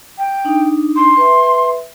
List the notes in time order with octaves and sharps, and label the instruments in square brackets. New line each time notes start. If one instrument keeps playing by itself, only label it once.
[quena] G5
[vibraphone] D4 D#4
[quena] C6
[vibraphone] B4 E5